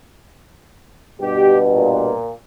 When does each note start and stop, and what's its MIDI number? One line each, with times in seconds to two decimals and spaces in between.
1.21 2.13 43
1.21 2.13 47
1.21 1.58 67
1.74 2.31 46